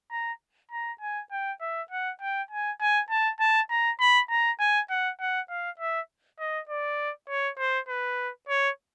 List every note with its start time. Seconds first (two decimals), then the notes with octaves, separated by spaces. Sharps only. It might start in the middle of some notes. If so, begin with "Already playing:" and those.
0.11 A#5
0.71 A#5
1.01 G#5
1.31 G5
1.61 E5
1.91 F#5
2.21 G5
2.51 G#5
2.81 G#5
3.10 A5
3.40 A5
3.70 A#5
4.00 B5
4.30 A#5
4.60 G#5
4.90 F#5
5.20 F#5
5.49 F5
5.79 E5
6.39 D#5
6.69 D5
7.29 C#5
7.59 C5
7.89 B4
8.49 C#5